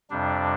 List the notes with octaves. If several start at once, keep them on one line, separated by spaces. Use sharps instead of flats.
F2 C3 G3 D4